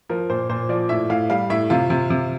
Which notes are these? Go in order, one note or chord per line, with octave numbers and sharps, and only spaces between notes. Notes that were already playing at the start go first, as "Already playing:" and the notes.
F3 A#4
A#2 C5
A#2 C5
F3 D5
A2 E5
A2 F5
G3 F5
A2 E5
C3 F4
C3
C3